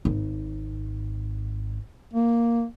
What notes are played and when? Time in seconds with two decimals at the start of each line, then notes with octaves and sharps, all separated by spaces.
0.05 G#1
2.13 A#3